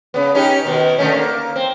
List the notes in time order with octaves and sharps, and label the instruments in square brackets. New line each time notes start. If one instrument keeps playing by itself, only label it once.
[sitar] C#3 B3
C#4 D#4 G4
B2 D#3
D3 A3 C#4
A#3
C4